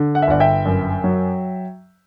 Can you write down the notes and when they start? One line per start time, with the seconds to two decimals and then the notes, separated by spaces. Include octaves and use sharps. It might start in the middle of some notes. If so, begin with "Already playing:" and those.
Already playing: D3
0.15 F#5
0.22 E5
0.27 G1 D5 F#5
0.40 E5 G5
0.65 F#2
1.04 F#3